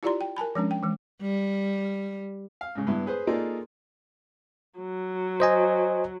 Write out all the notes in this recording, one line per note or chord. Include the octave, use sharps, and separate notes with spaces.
E4 F4 G4 D5 A#5 C6
G5
A#4 G#5 A5 B5
F3 G#3 C#4 D4
G5
E3 G#3
G3
F5
G#2 C#3
G2 B3 E4
G#4 B4 C5
A#3 D#4 F4 G#4 A4 D5
F#3
C5 D#5 G#5